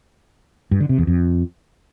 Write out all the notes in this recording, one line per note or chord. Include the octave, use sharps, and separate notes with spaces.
G2
D3
C3
E2
F2